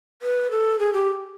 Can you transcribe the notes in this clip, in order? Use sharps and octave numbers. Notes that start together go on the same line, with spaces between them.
B4
A4
G#4
G4